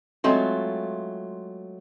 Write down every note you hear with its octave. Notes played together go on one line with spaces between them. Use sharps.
F#3 G#3 A3 C4 F4